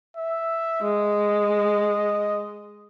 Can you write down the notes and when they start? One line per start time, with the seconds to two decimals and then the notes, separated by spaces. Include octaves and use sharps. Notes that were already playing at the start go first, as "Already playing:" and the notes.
0.17 E5
0.82 G#3 D#5